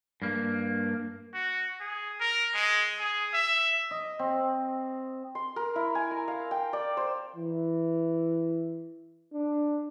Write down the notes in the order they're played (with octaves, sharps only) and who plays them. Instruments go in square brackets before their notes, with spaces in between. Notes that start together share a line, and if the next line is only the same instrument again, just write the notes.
[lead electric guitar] G2 A#3
[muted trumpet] F#4
G#4
A#4
G#3
G#4
E5
[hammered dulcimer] D#5
C4
[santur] C6
A#4
E4
G#5
A#5
F5
G5
D5
C5
[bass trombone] E3
D4